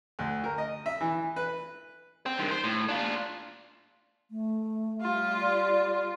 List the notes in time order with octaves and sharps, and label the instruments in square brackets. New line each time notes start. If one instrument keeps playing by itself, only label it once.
[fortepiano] D2
A#4
D#5
E5
E3
B4
[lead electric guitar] C5 G5
G2 D#3
C5
A2
D4 F4
[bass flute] A3
[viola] G3 F4
[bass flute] D5